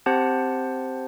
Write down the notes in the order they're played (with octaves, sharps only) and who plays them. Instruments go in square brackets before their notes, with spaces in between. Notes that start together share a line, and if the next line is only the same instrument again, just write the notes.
[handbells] C4 G4 C5 F#5 A5